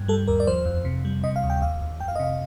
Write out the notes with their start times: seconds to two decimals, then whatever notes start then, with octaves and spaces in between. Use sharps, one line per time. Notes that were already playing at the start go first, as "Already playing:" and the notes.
Already playing: G2
0.08 G3 A4
0.27 D#2 A#4
0.40 D5
0.47 F3 C5
0.65 F2
0.85 C3
1.05 G3
1.24 C3 D#5
1.36 F5
1.43 D2
1.50 G5
1.61 D#2 F5
1.81 D#2
2.00 F2 G5
2.08 F5
2.15 D#5
2.20 C3 F5